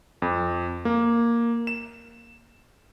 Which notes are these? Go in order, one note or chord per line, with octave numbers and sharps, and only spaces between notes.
F2
A#3
E7